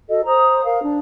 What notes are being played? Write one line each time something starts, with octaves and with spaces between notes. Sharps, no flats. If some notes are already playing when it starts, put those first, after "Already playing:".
F#4 A4 D#5
C5 A#5 D#6
A#4 F5
D4